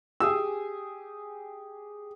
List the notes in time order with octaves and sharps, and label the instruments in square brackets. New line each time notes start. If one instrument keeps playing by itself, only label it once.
[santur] G4 G#4 G#5 [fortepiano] E6